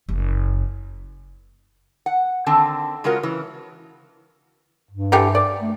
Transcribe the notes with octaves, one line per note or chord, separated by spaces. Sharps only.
F#1
F#5
D3 D#3 C4 A5
C#3 G#3 C#4 F4 F#4 A#4
C#3 E3
G2
D3 E3 G4
D5
A3